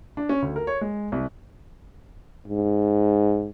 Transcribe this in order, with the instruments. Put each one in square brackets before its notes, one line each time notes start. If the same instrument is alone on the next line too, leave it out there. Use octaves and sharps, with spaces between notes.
[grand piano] D4
C#4
D2
A#4
C#5
G#3
C2
[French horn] G#2